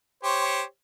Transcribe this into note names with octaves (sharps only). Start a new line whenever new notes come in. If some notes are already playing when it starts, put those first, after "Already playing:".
G4 C5 C#5